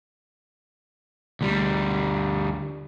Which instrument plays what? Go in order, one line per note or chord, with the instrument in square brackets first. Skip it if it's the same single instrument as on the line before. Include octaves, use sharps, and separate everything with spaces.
[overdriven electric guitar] D2 G3